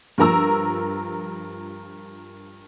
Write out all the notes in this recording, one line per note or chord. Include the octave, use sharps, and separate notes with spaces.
G2 F3 A#4 A#5 E6